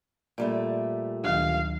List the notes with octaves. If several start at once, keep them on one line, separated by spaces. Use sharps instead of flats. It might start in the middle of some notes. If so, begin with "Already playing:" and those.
A#2 G3 A3 D5
D2 D#3 F#3 F5